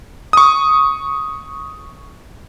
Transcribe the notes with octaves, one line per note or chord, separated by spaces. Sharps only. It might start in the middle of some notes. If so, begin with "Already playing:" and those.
C#6 D#6